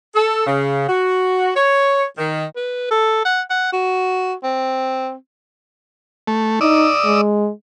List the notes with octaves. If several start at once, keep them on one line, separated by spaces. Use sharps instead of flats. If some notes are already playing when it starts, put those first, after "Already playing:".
A4
C#3
F#4
C#5
D#3
B4
A4
F#5
F#5
F#4
C4
A3
D#4 D5 D#6 E6
G#3